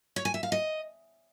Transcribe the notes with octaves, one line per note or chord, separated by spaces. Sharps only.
C#5
G#5
E5
F5
D#5